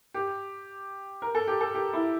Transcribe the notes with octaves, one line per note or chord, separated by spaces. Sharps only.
G4
A#4
A4
G4
A4
G4
E4